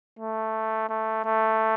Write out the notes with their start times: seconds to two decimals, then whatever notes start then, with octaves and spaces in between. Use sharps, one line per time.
0.19 A3
0.89 A3
1.25 A3